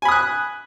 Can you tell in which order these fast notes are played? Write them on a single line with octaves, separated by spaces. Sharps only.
G#5 B5 D#6 F#6